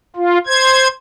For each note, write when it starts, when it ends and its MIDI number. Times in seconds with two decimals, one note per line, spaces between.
0.16 0.38 65
0.47 0.88 72
0.47 0.88 92